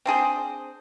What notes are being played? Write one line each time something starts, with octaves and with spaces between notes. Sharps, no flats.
C4 D4 G#4 C5